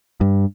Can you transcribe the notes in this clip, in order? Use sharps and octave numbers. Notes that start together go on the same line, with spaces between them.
G2